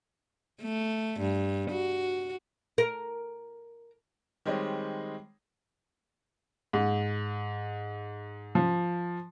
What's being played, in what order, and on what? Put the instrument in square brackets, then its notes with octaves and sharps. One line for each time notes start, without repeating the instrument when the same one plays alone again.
[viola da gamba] A3
G2
F#4
[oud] A#4
[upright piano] D#3 G3 G#3 C4 C#5 D#5
G#2
F3